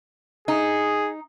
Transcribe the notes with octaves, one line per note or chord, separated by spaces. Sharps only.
D#4 G#4